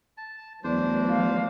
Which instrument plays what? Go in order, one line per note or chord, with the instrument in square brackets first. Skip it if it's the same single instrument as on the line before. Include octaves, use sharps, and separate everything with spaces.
[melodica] A5
[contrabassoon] E2 [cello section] E3 F#3 A3 [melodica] D4 C5
[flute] F5